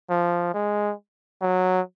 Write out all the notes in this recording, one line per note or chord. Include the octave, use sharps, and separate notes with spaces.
F3
G#3
F#3